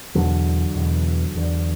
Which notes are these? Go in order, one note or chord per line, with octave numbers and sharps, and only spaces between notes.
E2 B2 D3 F#3
E2 B2
E2 D3